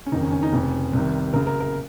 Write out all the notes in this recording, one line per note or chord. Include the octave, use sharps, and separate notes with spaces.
C#4
F#1 F2 D#3 D#4
C#4
C#4
D#4
F1 F2 C#3 C#4
C2 C3 D#3
F#1 F#2 C#3 A#4
A#4
A#4